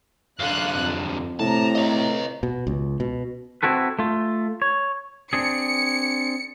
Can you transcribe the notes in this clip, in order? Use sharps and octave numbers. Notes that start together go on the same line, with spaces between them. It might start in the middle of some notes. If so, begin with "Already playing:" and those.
F#2 D3 F5 F#6
F2
A2 C3 A5 A#5
C#5 D#5
B2
C#2
B2
C4 E4 F#4 A4 B4
A3 F4
C#5
C4 D4 G#4 C#7